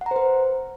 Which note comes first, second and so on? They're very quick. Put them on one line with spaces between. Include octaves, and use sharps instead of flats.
F#5 A#5 C5 B4